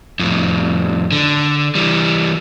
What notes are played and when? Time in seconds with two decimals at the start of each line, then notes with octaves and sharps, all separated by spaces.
0.20 F2 A2
1.12 D3
1.75 E3 G3